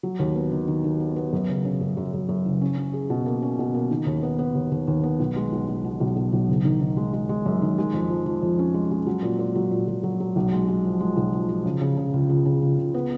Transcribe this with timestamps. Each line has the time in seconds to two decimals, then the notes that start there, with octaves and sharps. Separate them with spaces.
0.03 F#3
0.19 D#2
0.36 B3
0.52 D#3
0.68 D#3
0.84 D#3
1.00 B3
1.16 B3
1.33 F#2
1.49 C#3
1.65 C#3
1.81 F#2
1.97 F#2
2.14 F#2
2.29 F#2
2.46 F#1
2.62 C#4
2.78 C#4
2.93 G#4
3.10 B2
3.26 A#3
3.42 C#4
3.59 B2
3.74 A#3
3.91 D#3
4.06 D#2
4.23 B3
4.39 B3
4.55 D#2
4.71 D#2
4.88 D#2
5.03 B3
5.19 B1
5.36 G#3
5.52 B1
5.68 G#3
5.85 B2
6.00 B1
6.16 B2
6.33 B1
6.49 F#1
6.65 D#3
6.81 D#3
6.97 G#3
7.13 G#3
7.29 G#3
7.46 F#2
7.62 D#3
7.78 G#3
7.94 F2
8.10 F3
8.26 F3
8.42 F2
8.59 C#4
8.74 G#3
8.91 G#3
9.07 F#3
9.23 A#2
9.39 A#2
9.55 F#3
9.71 A#2
9.88 F#3
10.03 F#3
10.20 F#3
10.36 B1
10.53 G#3
10.68 G#3
10.84 F3
11.01 G#3
11.16 B1
11.33 F3
11.49 F3
11.66 C#3
11.81 C#3
11.97 C#3
12.14 C#2
12.29 C#2
12.46 C#3
12.63 C#2
12.78 C#2
12.94 B3